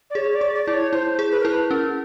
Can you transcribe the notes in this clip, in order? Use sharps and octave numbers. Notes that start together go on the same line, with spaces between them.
D5
G#4 C#5
C#5
D5
G#4
D5
E4 D5
C#5
E4 C5
G#4
B4
A#4
E4 B4
C#4 A#4